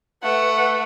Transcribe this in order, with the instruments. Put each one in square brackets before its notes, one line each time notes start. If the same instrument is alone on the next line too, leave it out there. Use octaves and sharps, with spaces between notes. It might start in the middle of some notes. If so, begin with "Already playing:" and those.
[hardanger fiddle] A3 [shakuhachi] B4 [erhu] F#5